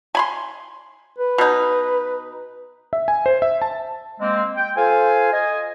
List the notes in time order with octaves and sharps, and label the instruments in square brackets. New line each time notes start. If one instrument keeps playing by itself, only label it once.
[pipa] G#5 B5 C6
[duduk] B4
[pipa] B2 D#4
[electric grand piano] E5
G#5
C5
E5
A5
[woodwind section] G#3 A#3 C4
G5
F4 A4 C5 F5 G#5
D#5 G#5